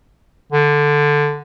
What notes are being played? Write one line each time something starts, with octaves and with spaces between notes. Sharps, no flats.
D3